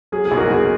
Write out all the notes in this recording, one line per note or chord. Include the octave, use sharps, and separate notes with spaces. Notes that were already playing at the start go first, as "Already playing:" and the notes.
F#3 G#4
G#4
B1
F#4 A#4
B1 G#4